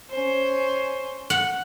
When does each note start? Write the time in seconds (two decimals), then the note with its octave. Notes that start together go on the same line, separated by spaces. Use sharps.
0.10 C#4 C5
1.30 F#5